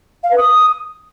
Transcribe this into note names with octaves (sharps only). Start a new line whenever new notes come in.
F5
B4
D#6